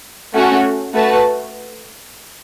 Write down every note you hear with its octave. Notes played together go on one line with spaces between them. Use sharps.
A3 C#4 F#4
A3 F#4 B4 A5